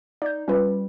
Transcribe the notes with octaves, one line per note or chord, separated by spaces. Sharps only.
D#4 D5 G6
G3 C#4 F4 B4